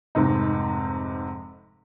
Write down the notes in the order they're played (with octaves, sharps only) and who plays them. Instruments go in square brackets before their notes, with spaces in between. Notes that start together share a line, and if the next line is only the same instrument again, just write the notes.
[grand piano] F1 G#2 C3 D#4